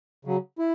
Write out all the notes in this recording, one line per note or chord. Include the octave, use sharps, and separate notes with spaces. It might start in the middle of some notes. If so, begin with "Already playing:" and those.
C#3 F#3
E4